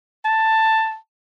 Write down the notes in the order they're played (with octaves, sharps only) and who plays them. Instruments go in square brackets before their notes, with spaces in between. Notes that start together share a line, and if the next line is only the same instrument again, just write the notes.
[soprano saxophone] A5